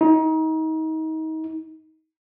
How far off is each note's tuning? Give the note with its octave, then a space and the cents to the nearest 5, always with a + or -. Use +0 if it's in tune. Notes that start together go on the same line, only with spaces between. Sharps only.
D#4 +30